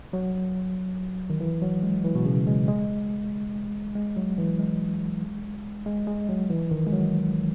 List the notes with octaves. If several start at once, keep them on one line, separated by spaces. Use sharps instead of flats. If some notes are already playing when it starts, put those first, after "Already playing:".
F#3
D#3
E3
F#3
G#3
E3
B2
C#3
G#3
G#3
G#3
F#3
E3
G#3
G#3
G#3
F#3
E3
D#3
G#3
F#3